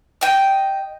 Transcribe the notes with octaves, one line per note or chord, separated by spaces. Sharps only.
D#5 G5